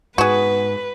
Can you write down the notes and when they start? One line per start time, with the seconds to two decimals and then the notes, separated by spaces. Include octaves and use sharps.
0.18 G#2 B3 F#4 G#4 B4